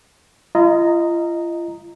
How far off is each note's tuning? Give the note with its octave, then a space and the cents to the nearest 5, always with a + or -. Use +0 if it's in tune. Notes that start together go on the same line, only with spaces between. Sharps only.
F4 -40 D#5 +0 A#5 -5